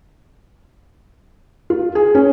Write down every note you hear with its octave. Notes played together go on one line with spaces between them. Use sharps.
F4
G#4
C#4